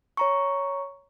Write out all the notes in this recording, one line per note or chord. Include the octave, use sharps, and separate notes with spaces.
C#5 A#5 C#6